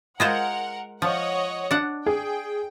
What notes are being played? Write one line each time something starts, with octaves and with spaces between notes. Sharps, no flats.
G#3 F4 A#4 C5 F#5
F3 C#5 D#5 F#5
D4 F#5
G#4 G5